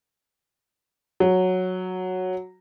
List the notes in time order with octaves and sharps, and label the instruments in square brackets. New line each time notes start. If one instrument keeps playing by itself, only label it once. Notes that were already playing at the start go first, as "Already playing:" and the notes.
[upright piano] F#3